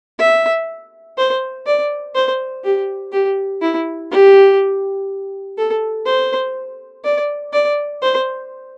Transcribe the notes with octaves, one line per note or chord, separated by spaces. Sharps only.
E5
C5
D5
C5
G4
G4
E4
G4
A4
C5
D5
D5
C5